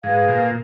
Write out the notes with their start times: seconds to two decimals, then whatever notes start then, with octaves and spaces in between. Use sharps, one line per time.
0.03 G#2 G#4 B4 F5
0.28 A#2